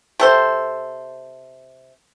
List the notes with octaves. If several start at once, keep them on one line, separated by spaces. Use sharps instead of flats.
C3 A4 C5